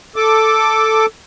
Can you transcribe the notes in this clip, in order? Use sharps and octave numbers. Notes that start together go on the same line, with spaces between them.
A4 D6